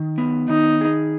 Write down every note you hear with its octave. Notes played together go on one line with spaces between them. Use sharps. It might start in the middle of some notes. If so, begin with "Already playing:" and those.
Already playing: D#3
B3
D#3 D#4
G#4